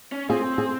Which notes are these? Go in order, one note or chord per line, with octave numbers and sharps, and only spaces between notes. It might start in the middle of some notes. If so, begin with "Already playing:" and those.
C#4
C4 F4 G#4
G#4